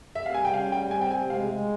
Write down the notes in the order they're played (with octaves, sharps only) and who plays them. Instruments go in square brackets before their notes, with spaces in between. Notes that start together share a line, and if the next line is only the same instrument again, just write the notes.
[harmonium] C3 [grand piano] E5
[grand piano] F5
[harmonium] G3 [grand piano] G#5
[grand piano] G5
[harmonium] C#4 [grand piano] F5
[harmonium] G3 [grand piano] G5
[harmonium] C4 [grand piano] G#5
[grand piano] G5
[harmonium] C3 [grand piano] G#5
[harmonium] G#3 [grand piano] F5
[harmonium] G#3